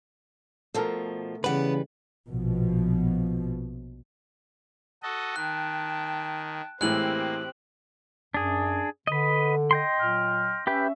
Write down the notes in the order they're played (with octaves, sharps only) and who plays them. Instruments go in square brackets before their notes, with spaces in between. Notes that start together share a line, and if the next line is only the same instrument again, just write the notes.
[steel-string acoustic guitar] B2 F3 [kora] A3 A4 A#4
[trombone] C#3 [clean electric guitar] E3 G3 B4 [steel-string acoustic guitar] B3 F#5
[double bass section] A#1 B2 F3
[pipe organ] F#4 A4 D#5
[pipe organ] D#3 [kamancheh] G5 A5 [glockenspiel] F#6
[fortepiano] A2 E3 G#3 [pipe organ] A#3 [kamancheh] C4 G4 [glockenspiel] F#6 F#7
[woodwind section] F#2 [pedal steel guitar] D4 G#4
[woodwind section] D3 [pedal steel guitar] B4 D#5
[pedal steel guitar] D#5 G5 C6
[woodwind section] A#2 F#3 F6
[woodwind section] C#4 E5 [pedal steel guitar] G4 B4 G5